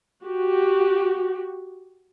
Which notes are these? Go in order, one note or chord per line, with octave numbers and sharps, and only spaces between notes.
F#4 G4